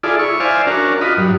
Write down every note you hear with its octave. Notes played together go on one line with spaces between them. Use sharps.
E4 F4 G#4 A4 D5
E4 C#6
C5 D5 E5 F5 G#5
C#4 D4 F#4 A#4
F4 F#4 D#5 B5
G2 F#3